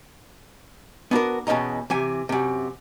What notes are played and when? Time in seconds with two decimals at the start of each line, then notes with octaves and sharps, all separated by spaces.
1.11 B3 D4 F#4 A#4
1.47 E2 B2 C#4 D#5 A#5
1.90 C3 E3 G#5
2.29 F#2 C3